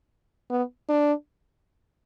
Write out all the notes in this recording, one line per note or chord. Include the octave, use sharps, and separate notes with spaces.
B3
D4